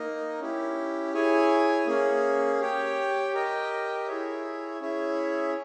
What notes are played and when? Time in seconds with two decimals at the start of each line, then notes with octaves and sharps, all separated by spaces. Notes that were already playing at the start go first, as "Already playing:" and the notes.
Already playing: A#3 D#4 A#4 D#5
0.40 C#4 E4 G4
1.13 E4 G#4 C#5 G#5
1.87 A#3 C#4 G#4
2.60 G4 C#5 G5
3.33 G4 A#4 D#5 G5
4.07 E4 G#4 C#5 E5
4.80 C#4 E4 G#4 C#5 E5